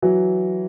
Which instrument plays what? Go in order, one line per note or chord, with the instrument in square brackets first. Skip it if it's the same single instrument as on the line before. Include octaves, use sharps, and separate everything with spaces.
[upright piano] E3 F#3